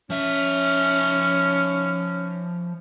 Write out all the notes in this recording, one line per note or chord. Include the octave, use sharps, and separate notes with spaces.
F3 C#4 E5